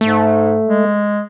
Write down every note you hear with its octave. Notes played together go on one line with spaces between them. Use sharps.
G#2 A3
G#3